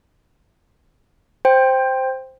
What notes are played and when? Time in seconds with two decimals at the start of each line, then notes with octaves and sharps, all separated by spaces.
1.45 C5 G5